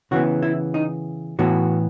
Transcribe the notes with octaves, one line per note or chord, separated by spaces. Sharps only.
C#3 E3 B3 F#4
E4
D#4
A2 E3 B3 F#4